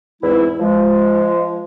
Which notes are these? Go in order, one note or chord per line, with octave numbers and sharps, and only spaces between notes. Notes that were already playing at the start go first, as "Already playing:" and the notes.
E2 G#2 E3 G#3 C4 E4
F3 G#3